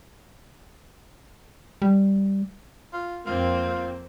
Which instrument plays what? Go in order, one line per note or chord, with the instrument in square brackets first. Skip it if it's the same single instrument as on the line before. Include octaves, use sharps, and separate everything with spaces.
[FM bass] G3
[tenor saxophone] F4
[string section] F2 A#3 C4 [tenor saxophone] F4